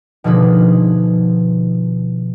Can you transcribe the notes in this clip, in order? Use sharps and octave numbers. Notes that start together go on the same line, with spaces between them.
B2 D3 F3 D#4 G#4 B4